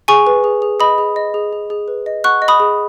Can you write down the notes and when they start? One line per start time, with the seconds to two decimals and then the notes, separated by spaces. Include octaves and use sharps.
0.08 G#4 G#5 C#6
0.27 B4
0.44 G#4
0.62 G#4
0.80 D#5 B5 D#6
0.98 G#4
1.16 D#5
1.34 G#4
1.53 G#4
1.70 G#4
1.88 B4
2.06 D#5
2.24 F#5 C#6 F#6
2.42 D#5
2.48 B5 D#6
2.60 G#4